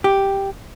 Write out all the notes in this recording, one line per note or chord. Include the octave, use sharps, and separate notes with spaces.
G4